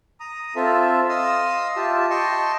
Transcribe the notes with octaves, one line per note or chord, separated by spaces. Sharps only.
A#5 D#6
C4 F4 A4 E5
D#5 F5 C6 D#6 E6
F4 G4 E5 A5
D#5 G5 A5 C6 C#6